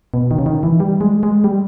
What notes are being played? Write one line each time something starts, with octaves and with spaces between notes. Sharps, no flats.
B2
D#3
C#3
D#3
E3
G3
G#3
G#3
G3